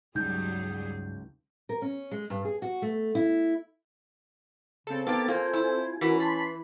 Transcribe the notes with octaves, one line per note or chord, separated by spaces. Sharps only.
C#2 G2 F#3 G3 D#4 G#4 G6
A#4
C#4
G#3
G2
G#4
F#4
A3
E4
C#3 C4 A4
A#3 B3 D#4 G4 A6
A#3 F4 C5 G#5
E4
E3 C#4 F#4 A#4 B5
A5 B5 C6